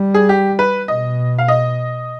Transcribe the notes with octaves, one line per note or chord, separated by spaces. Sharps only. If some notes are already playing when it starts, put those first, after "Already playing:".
Already playing: G3
G#4
G4
B4
B2 D#5
F5
D#5